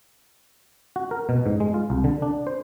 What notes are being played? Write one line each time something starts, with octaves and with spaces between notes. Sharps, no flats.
F#4
A#4
B2
G#2
G#3
F4
C2
D3
D4
C5